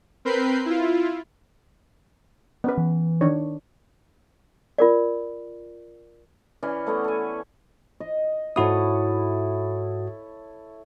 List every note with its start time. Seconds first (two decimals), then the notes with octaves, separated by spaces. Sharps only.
0.25 C4 A#4 B4 B5 G6 C7
0.66 E4 F4
2.64 B3 C#4 B4
2.78 E3
3.21 D#3 D4 C#5
4.78 F4 A#4 D5
6.63 E3 C#4 D5
6.86 A3 B3 C#5 F#5
7.04 A4 G#5
8.00 D#5
8.56 G#2 E4 F#4 A4 C#5 D#6